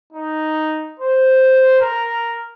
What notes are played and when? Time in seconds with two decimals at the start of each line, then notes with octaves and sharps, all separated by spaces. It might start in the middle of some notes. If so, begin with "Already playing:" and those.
0.13 D#4
1.00 C5
1.80 A#4